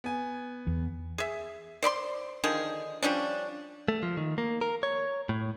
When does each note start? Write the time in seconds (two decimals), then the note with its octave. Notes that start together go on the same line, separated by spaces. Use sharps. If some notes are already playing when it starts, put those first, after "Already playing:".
0.04 B3 G#5
0.67 E2
1.18 G#4 E5
1.82 C5 D5 B5 C6
2.44 D3 D#3 F3 G#4
3.02 F3 G3 C#4 D4
3.88 A3
4.03 F3
4.17 D#3
4.38 A#3
4.61 A#4
4.83 C#5
5.29 A2